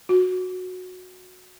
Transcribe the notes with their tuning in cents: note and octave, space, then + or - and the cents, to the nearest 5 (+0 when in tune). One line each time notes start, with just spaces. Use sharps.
F#4 -15